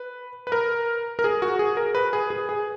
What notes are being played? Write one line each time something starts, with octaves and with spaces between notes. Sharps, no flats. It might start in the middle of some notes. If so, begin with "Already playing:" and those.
Already playing: B4
B4
A#4
A#4
G#4
F#4
G#4
A#4
B4
G#4
G#4
G#4